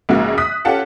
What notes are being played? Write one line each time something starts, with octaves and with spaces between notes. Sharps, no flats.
A#1 G#2 C#3 A#3 F#4
D#6 F#6 B6
C#4 F4 G4 A4 F#5 A5